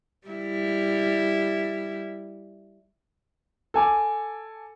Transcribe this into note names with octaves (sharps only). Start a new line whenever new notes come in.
G3 E4
A4 G#5 D6